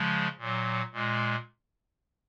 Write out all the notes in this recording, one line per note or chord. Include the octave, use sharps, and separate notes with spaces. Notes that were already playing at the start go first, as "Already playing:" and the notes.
Already playing: C#3 F3 G#3
A#2 F#3
A#2 G#3